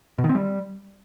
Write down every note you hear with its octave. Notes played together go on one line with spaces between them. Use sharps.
B2
D#3
C4
G3